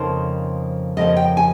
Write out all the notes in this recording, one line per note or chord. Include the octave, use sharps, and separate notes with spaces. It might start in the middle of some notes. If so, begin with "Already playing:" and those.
Already playing: F2 C#3 F3 A#3 D#4 C5
F2 C#3 F3 A#3 D#5
G5
G#5